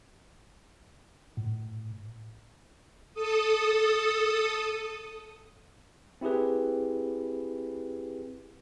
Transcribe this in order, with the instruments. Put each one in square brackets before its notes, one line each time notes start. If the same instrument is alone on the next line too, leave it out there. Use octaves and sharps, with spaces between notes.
[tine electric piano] A2
[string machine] A4 D#6
[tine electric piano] C4 E4 G4 G#4 B4